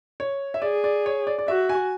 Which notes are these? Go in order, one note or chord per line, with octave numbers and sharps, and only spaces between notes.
C#5
E5
G#4 D5
D5
C#5
D5
D5
F#4 E5
G#5